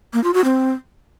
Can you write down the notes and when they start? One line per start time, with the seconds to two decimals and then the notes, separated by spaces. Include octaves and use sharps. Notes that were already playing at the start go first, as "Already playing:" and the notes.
0.13 A#3
0.24 F4
0.34 F#4
0.44 C4